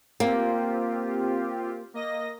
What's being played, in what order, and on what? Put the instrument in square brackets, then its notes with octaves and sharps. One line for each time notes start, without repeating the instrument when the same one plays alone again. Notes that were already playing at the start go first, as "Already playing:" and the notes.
[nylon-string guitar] A#3 [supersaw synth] C4 F4 G4
[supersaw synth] A#3 D#5 A#6